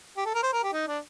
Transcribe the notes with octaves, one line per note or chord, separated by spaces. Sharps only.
G4
A4
A#4
C5
A#4
G4
D#4
D4